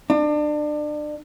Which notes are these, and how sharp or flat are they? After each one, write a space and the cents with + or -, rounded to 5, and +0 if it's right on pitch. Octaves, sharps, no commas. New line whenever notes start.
D4 +30